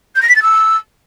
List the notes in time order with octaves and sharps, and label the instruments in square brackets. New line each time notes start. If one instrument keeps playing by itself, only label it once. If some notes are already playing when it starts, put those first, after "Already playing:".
[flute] G6
A#6
B6
A6
E6